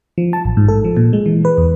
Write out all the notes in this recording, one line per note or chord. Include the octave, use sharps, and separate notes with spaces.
F3
A5
A1
G#2
A4
F3
A#2
G#3
E3
B4
E2